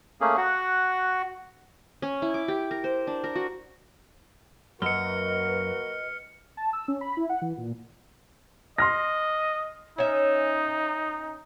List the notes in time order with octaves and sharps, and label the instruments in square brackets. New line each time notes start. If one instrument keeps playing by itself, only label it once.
[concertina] A3 A#3 C#4 G#4
F#4 F#5
[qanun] C#4
E4
D6
G4
A#4
C5
D4
A#4
F#4
[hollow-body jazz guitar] F#2 [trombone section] A#3 F#4 A#4 [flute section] B4 D#5 [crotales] F6 C#7
[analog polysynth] A5
E6
C#4
B5
E4
F#5
E3
A#2
[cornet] D#5 [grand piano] C6 F6 A#6
[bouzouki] C#4 E5 [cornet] D#4